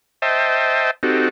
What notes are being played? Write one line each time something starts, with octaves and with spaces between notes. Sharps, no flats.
C5 D#5 E5 G5 A5
C4 D#4 F#4 G4 A4